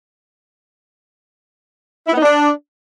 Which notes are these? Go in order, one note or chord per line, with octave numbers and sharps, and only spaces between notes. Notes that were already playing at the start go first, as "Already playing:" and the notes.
E4
B3
D#4
D4